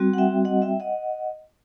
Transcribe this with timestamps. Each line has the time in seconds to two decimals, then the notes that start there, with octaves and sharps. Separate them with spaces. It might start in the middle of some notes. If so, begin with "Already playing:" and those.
Already playing: G3 C4 F#4
0.13 F#5
0.18 E5 G5
0.45 D#5 F#5
0.62 E5 G5
0.80 D#5 F#5